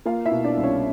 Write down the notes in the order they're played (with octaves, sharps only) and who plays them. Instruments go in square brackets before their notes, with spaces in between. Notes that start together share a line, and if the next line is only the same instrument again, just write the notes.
[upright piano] A#3 F4 F5
E4 E5
B2
D4 D5
C2
C#4 C#5